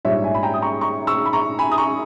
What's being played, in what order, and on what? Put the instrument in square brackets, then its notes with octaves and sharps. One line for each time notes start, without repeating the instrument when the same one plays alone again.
[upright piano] A#1 G#2 G3 C#5 E5
E5 G#5
B5
G5 A#5
D#6
A#5 C#6
A#5 C#6
C#6 E6
B5
A#5 C#6
G#5 B5
D#6
A#5 C#6